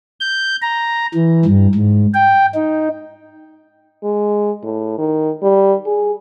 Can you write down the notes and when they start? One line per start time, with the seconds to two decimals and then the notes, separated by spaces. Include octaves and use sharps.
0.20 G6
0.62 A#5
1.14 E3
1.45 G2
1.75 G#2
2.14 G5
2.55 D#4
4.04 G#3
4.63 A2
4.98 D#3
5.43 G3
5.86 G#4